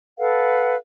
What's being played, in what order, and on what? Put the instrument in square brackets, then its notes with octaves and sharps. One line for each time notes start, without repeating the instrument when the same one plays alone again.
[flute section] A4 B4 F5 F#5